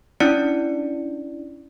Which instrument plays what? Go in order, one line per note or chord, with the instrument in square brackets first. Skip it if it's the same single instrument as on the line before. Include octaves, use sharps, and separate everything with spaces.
[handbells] C#4 D4 E4 D5 C#7